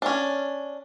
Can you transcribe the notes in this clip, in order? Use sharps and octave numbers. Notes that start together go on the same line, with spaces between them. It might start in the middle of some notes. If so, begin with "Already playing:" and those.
C#4 D4